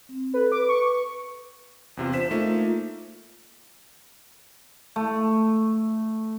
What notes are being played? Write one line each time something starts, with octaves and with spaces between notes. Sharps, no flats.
C4
A4 B4
B4 D6
C#6
E2 C3 F4
D4 C5 B6 E7
A3 A#3 D#4 F4
A3